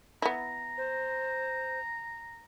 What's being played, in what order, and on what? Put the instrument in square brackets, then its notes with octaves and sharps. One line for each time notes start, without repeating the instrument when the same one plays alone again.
[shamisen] B3 E4 [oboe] A#5
[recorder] C5